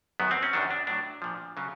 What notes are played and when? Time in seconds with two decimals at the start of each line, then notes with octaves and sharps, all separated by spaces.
0.20 F#2 D#3 F#3 B3
0.31 C4
0.43 C#4
0.53 F#2 D#3 F#3 D4
0.71 D4
0.87 A2 F#3 D4
1.22 A#2 F3
1.57 C#3 F#3